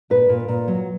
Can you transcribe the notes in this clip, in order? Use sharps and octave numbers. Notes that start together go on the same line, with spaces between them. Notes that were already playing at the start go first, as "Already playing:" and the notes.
A#2 B4
A#2
A#2
F#3